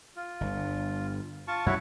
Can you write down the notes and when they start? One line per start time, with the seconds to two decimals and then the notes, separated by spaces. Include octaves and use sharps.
0.16 F4
0.41 G1
1.48 F4 A5 C#6
1.66 F#2 G3 E4 F#4 C#5